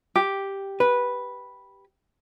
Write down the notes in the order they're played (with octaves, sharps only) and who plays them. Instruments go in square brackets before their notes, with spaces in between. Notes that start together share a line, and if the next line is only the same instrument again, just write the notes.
[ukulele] G4
[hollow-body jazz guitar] B4